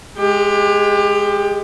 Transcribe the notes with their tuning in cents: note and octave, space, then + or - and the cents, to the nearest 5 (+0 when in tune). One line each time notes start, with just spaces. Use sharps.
G#3 +0 G4 +25